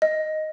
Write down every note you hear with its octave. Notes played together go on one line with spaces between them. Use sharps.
D#5